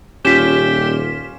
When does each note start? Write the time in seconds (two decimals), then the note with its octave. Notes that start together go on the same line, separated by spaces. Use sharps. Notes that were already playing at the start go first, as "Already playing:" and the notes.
0.25 D#1 C#4 F4 G4 B6 E7